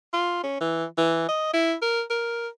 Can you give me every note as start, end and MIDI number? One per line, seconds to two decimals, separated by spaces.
0.13 0.41 65
0.43 0.59 61
0.61 0.85 52
0.98 1.24 52
1.29 1.52 75
1.54 1.75 64
1.82 2.03 70
2.10 2.48 70